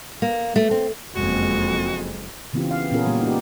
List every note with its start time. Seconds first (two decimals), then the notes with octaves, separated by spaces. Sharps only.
0.22 A#3
0.56 A3
0.71 C4
1.15 F#1 F2 G#3 F#4
2.53 C#3 E3 B3 C4 F4 G4
2.71 F5
2.91 A#2 B3 C#4 F4 G#4 A#4
3.06 A#2 G3 A#3 B3 G4
3.21 D#4 G4